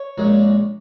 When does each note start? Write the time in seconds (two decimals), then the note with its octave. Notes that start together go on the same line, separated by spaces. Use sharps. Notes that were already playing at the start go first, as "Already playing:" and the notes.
Already playing: C#5
0.18 A#1 A#2 G#3 C#4